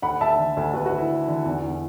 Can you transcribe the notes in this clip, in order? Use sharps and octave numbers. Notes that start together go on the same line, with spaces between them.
D2 F#5 B5
D2 E5 A5
D3
D2
D2 F#4 B4
F#4
D2
E4
D3
D3
E2
E2